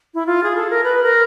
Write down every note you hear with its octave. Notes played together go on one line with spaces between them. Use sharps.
E4
F4
G#4
A4
A#4
B4
A#4